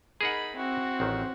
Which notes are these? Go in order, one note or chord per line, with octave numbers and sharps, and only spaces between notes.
D#4 G#4 A#4 F#5 B5
C4 E4 F#4
A1 D#3